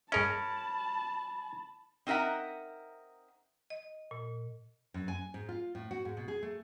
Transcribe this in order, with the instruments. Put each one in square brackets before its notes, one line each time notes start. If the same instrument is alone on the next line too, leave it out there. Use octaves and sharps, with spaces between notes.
[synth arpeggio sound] G2 G#4 D#5 [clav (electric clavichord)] C#4 A#4 [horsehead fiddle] A5 [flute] B5
[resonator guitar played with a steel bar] C4 D#4 A#4 E5 F#5
[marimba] D#5
A#2
[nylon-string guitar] F#2
G#5
G#2
F4
A2
F#4
G#2
B2
G#4
A3